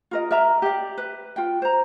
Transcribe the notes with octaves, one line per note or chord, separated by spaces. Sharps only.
F4 A#4 D#5
A#4 D5 E5 A#5
G4 D5
B4
F4 G5
C5 A#5